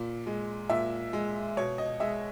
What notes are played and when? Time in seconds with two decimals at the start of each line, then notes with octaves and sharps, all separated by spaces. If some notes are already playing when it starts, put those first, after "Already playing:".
Already playing: A#2
0.26 G#3
0.70 A#2 E5
1.13 G#3
1.57 B2 C#5
1.78 D#5
2.00 G#3 E5